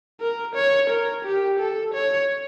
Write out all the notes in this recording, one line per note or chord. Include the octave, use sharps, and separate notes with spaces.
A#4
C#5
A#4
G4
A4
C#5